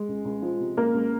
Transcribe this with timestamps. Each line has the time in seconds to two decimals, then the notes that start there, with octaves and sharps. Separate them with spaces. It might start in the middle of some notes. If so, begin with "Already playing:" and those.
Already playing: G#3
0.08 C#2
0.25 C#2
0.42 F3
0.60 C3
0.77 C#2 A#3 A#4
0.94 C#2